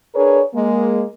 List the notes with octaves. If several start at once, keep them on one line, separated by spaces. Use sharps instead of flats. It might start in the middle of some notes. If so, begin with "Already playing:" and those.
D4 G#4 A#4 B4 C#5
G#3 A#3